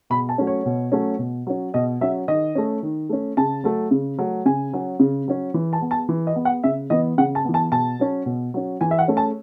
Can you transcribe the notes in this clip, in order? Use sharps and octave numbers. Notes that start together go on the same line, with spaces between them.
B2 B5
A5
F#3 A3 C#4
C#5
B2
F#3 A3 C#4
B2
F#3 C#4
B2 D#5
F#3 C#4 E5
D#3 D#5
A3 C#4
D#3
A3 C#4
C#3 A5
F#3 A3
C#3
F#3 A3
C#3 G#5
F#3 C#4
C#3
F#3 C#4
E3
A5
B3
A5
E3
D#5
B3
F#5
C#3 E5
E3 B3 D#5
C#3 F#5
A5
E3 B3
A5
B2 A5
F#3 C#4
B2
F#3 C#4
E3 G#5
E5
F#5
A3 C#4
A5